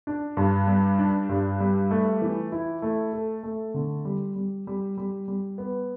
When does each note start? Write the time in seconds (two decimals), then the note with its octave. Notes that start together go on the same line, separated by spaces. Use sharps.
0.07 D4
0.37 G2
0.67 G3
0.99 D4
1.29 G2
1.60 G3
1.91 A3
2.22 E3
2.52 E4
2.82 A3
3.13 A4
3.43 A3
3.74 D3
4.05 G3
4.36 G3
4.67 G3
4.98 G3
5.28 G3
5.58 B3